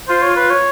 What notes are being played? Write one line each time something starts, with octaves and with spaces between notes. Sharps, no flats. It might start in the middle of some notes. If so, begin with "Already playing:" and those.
F4 C5
C#5
B4
C#5